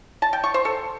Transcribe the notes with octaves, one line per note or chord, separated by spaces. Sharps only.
A5
G5
C#6
C5
A4